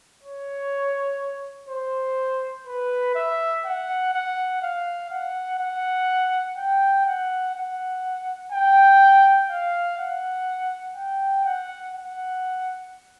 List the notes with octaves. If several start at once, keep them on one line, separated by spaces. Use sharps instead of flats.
C#5
C5
B4
E5
F#5
F#5
F5
F#5
F#5
G5
F#5
F#5
G5
F5
F#5
G5
F#5
F#5